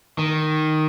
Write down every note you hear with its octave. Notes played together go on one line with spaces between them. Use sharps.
D#3